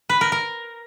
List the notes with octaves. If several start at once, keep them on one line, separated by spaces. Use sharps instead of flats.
B4
A#4
A#4